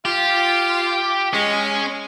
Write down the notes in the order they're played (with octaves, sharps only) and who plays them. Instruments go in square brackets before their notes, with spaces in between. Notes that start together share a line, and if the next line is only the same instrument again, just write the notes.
[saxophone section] F4 [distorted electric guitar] G4
[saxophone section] G#3 [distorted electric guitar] C#4